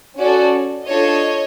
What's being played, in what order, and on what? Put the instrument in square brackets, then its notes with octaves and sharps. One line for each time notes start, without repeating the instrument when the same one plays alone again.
[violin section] C#4 F#4 A4 D5
D4 F4 A4 C#5 D#5